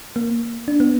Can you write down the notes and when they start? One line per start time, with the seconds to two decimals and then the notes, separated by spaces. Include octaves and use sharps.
0.16 A#3
0.68 D4
0.80 B3